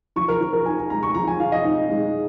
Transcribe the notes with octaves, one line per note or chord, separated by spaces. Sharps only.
F3 C#6
A#4
F3
A#4
D#4 G#5
A#5
G#3 A#5
C#6
F3 A#5
G#5
F3 F5
D#5
D#4
G#3